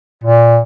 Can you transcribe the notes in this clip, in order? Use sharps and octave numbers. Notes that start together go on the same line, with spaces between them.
A#2